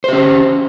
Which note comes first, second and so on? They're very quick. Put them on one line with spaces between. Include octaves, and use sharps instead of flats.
C5 G4 C#4